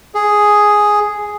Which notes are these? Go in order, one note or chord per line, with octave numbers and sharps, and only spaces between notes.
G#4